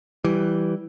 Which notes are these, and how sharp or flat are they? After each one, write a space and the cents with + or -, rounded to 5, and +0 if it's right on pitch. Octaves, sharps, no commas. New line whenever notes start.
E3 +0 G3 -10